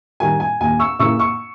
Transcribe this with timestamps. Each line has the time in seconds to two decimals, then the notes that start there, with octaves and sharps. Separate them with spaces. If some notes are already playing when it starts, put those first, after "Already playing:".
0.20 D#3 G3 G#5
0.40 G#5
0.60 D#2 G#5
0.79 C#6 E6
0.99 C#3 E3 A#3 E4 C#6 E6
1.19 C#6 E6